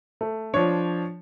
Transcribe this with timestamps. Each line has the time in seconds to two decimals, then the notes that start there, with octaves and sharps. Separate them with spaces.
0.21 A3
0.54 F3 D4 C#5